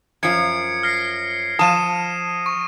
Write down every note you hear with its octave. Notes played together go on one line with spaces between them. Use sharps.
F#2 F3 G#6 C#7 D7
F6 A#6 C7
F3 A5 D#6 D#7 E7
C#6